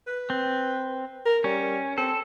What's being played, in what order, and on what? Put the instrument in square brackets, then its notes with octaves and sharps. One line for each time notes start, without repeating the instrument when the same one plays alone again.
[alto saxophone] B4
[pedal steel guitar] C4
[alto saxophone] A#4
[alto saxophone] G3 [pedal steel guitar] C#4
[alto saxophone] C4 [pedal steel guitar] A4